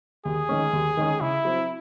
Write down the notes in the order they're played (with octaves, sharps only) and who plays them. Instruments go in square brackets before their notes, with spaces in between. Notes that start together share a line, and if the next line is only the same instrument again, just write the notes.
[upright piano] D#2 [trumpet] G#4
[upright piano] D#3 G#3 C#4
D#2
D#3 G#3 C#4
[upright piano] C#3 [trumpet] E4
[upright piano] F#3 C4